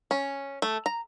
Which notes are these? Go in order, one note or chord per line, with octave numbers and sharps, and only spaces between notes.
C#4
A3
A#5